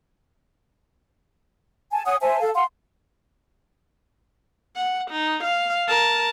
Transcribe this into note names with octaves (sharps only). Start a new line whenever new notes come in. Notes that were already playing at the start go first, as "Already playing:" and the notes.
G#5 A5
C#5 F#5 G#5 D#6
C5 E5 G#5 A5
A4 F5
F5 F#5 C6
F#5
D#4
F5
A#4 A5